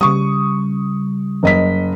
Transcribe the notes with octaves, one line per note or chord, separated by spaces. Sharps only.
C#3 G3 C#6 D#6
F#1 D#5 B6